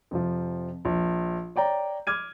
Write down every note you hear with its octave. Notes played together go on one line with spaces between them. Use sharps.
F2 C3 F3
A#1
C#5 D5 G5 A#5
D6 F6 G#6 D#7